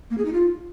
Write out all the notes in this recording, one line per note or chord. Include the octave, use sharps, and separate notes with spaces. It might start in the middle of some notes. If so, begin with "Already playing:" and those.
A#3
G#4
D#4
F4